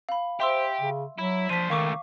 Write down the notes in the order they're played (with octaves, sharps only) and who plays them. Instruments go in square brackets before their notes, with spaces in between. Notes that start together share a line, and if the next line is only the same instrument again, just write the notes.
[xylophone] F5 B5
[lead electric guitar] G4 [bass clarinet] C5 [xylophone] E5 C6 E6
[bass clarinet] C#3
[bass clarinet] F#3 [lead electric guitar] E4
[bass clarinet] F3 [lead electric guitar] D4 C5 [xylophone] B6 D#7
[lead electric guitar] C#2 A3 [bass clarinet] D#3 [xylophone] F5 C#6 D6